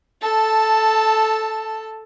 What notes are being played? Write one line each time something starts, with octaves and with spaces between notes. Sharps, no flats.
A4 A5